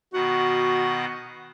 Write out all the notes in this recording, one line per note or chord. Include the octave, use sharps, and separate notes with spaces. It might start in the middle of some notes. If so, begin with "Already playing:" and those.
B2 D#3 F#4 F#5